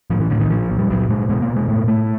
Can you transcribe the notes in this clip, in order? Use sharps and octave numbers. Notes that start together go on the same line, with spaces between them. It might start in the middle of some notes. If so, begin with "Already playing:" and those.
A2 F3
E3
A2 D3
D#3
A#2 F3
A#2
G3
A#2 F#3
A#2 G#3
B2 G#3
A#3
B2
G#3
A2 A3
A2 A3